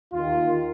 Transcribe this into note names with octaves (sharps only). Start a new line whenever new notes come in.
D#2 D#3 F4